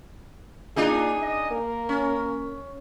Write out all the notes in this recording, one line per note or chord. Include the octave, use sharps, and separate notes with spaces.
A#3 D4 D#4 F4 G#4
D#5
A#3 A#4
C#4